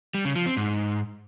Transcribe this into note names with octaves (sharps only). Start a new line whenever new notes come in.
G3
C#3
F3
C4
G#2